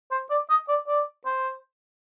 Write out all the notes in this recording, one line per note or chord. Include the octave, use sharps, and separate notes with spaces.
C5
D5
D#5
D5
D5
C5